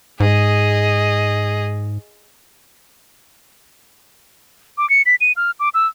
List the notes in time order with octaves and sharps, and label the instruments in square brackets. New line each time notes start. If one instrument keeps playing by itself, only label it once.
[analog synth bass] G#2 [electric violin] G#4 D#5
[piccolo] D6
C#7
B6
D#7
F6
D6
E6